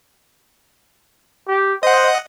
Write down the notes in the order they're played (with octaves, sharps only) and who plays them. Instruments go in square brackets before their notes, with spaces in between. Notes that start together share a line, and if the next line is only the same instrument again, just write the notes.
[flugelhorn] G4
[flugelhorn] C5 [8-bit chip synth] D#5 F#5